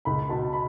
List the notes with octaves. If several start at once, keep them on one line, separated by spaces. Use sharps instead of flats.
C#2 B5
B2 A5
B5